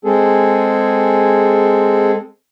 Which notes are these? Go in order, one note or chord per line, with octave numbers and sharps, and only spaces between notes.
G#3 C4 G#4 A4